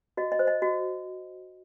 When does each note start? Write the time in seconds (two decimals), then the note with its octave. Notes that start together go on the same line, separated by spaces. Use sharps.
0.17 F#4 D#5
0.32 D#5
0.39 C5
0.47 D#5
0.62 F#4 D#5